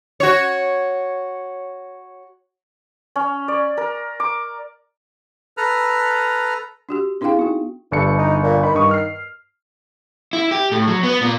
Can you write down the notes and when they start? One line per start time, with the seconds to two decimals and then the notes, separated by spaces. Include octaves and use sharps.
0.20 F#4 C#5
3.16 C#4
3.48 D5
3.77 A#4
4.20 D6
5.57 A4 B4 A#5 F6
6.89 D4 F#4 G4
7.21 C4 D4 E4 G#4 F5 G5
7.37 B3 D#4 F#4
7.92 G1 G2 A4 C#7
8.18 D#4
8.43 A#2
8.63 D#3 B5
8.75 G2 C#6 D#6
8.91 F6 C7
10.33 E4
10.51 G4
10.72 A2
10.87 F#3
11.03 B3
11.21 A#2